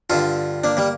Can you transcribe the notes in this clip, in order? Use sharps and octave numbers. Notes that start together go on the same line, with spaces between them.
G2 D3 F4 A4
A#3 D4
G3 A#3